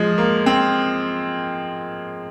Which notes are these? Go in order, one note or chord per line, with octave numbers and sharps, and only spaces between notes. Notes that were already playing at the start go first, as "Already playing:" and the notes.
Already playing: F3 G#3
A#3
C4